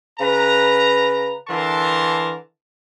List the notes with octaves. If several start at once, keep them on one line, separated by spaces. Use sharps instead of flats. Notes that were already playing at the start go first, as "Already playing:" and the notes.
C#3 B4 A#5
D3 E3 A#4 A5 C6